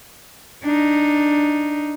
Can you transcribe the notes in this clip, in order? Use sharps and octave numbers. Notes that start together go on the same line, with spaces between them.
D4 D#4